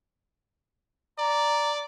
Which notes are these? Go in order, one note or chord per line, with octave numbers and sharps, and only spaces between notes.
D5 A#5